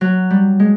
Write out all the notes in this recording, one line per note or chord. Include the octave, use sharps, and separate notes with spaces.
F#3
G3
G#3